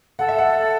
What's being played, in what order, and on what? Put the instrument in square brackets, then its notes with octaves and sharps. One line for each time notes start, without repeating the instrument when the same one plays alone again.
[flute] A4 [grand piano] F#5
[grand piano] E5
F#5